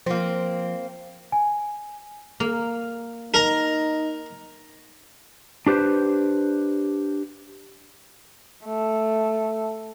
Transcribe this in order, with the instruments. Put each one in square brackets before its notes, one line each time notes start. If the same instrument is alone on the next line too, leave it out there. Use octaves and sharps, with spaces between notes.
[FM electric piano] F3 F4 [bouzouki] A#3 C4
[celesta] G#5
[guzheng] A#3
[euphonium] D#4 [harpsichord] A#4 A#5
[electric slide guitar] D4 G4 B4 C5
[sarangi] A3